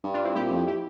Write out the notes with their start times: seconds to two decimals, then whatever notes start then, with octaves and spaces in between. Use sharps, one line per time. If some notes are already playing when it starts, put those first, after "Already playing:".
0.04 G2
0.14 D4 F4
0.25 C4 E4
0.35 A#2 E4 G4
0.52 F2
0.67 E4 G4